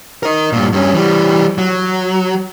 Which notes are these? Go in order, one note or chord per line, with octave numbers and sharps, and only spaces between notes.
A#4 D#5
G2 A#2
G2 C#4
E3 G3
F#3